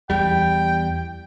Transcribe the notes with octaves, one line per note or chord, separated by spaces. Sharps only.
E2 G3 G5